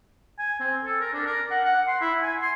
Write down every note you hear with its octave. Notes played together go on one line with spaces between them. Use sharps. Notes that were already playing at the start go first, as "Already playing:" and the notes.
G#5
C4
A4
A#4
D4
A#4
F#5
F#5
C6
E4
G#5
C6